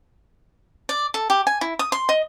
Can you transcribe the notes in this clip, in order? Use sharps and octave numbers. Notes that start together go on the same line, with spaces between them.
D5
A4
G4
G#5
E4
D#6
C6
D#5